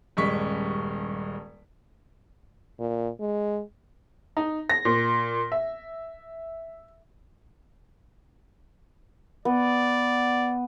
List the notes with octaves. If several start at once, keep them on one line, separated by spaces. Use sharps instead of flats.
D#1 G2 G#3 C#6 B6
A#2
G#3
D#4
A#6
A#2
E5
B3 D5